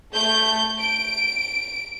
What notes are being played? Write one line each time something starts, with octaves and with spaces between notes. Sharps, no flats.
A3 G6
D7